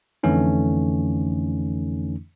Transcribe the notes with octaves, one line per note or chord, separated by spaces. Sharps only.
F2 D3 E3 A3 C#4 D#4